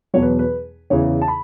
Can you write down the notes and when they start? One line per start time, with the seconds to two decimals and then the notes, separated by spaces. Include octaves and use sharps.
0.14 E2 B2 F#3 C#5
0.22 B4
0.39 B4
0.90 E2 C#3 E3 C#5
1.22 A5
1.28 B5